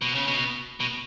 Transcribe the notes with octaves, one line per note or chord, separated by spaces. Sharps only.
B2
C#3
B2
B2